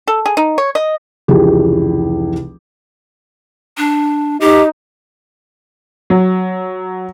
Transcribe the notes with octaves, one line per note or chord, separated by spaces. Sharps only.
A4
G#4
D#4
C#5
D#5
F1 C#2 E3 G4 G#4
D4
D#4 G4
F#3